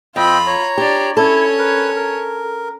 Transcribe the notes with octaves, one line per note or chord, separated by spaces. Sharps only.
F2 C4 F4 D#5 G5 B5
C#5 A#5
D4 G4 D5
C#4 E4 A4 C#5
A#4 B4
A#4